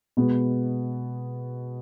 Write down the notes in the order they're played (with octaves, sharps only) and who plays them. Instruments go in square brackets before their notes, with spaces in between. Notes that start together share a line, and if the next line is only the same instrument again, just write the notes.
[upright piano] B2 G#3 B3